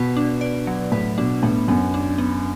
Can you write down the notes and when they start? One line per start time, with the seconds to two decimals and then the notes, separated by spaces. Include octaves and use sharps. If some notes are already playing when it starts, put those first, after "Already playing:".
Already playing: B2 B4
0.17 D4
0.41 D5
0.67 F#3
0.92 A2 B4
1.18 B2 D4
1.43 A2 B3
1.68 F#2 B3
1.94 D4
2.18 B3